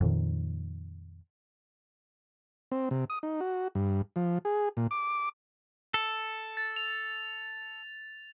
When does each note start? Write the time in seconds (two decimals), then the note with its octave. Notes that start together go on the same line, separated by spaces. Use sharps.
0.01 F2 A#2 D#3
2.72 C4
2.91 C3
3.10 D#6
3.23 D#4
3.41 F#4
3.75 G2
4.16 F3
4.45 G#4
4.77 A#2
4.91 D6
5.94 A4
6.57 A6
6.76 F7